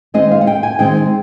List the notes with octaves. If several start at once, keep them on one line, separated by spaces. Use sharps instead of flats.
D#3 G#3 C4 D#4 D#5
F5
F#5
G5
G#5
D#3 G#3 C4 D#4 G5